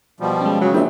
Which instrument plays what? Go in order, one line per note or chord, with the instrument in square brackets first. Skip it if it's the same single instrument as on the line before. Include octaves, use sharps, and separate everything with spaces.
[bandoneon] B2 F3 G3
[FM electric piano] G#3 C#4
[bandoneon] C#3 [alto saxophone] F#3
[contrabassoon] A#1 [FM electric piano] E5 G5